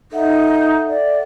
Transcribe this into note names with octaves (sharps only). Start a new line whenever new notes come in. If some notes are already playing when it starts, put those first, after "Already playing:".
D#4 A4 E5 F#5
D5